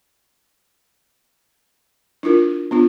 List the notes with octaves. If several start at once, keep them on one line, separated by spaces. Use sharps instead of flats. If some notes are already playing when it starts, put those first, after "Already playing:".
D4 E4 F4 A#4
B3 D4 F4